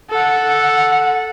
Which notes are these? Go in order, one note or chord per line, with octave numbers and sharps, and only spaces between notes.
A4 F#5